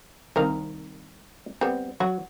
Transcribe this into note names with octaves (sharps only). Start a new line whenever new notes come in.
C2 D#3 C4 D#4 A#4 F5
G3 B3 C4
F#3 F#4